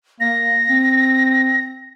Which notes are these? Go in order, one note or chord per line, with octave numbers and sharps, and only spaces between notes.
A#3 A#6
C4